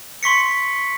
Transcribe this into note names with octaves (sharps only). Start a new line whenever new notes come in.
C6 C#6 B6 C#7